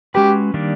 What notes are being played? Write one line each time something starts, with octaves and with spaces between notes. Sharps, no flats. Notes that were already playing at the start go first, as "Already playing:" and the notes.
G#3 C#4 F#4 G4 B4
D#3 G3 A#3 D4